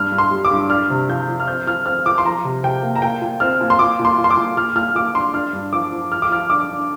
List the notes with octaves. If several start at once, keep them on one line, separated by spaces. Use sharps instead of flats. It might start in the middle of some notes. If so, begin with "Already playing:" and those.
Already playing: G2 F6
G2
C6
G3
D6
G2
D4 F6
C3
F3 G6
F3
F6
C4 G6
F3 F6
C4 F6
F4 D6
C6
F3 A#5
C3
C3 G5
A#3
A#5
A#2 G5
A#2
C4 F6
A#2
C6
A#2 D6
A#2
C6
F4
C6
D6
A#2
A#2 F6
A#2 F6
A#2 D6
D4 C6
D4 F6
G2
F3 D6
F3
F4 F6
D6
F3 F6
D4 D6
D4